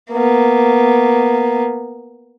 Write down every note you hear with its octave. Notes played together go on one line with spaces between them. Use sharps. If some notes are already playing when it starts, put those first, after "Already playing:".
A#3 B3